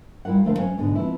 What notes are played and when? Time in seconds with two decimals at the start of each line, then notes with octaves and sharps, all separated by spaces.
0.25 G3 E4 F4 A#4 F#5
0.45 D3 F3 A3 A#4 C5 F5
0.58 F#3 C#4
0.78 G#2 B2 D3 D4 D#4
0.95 F3 B3 C4 E4